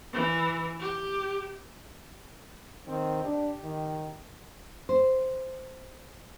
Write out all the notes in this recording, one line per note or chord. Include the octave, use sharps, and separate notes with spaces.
E3
G4
D#3 C4
D4 G4
D#3
C5